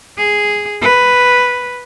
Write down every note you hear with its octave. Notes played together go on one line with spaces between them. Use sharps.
G#4
B4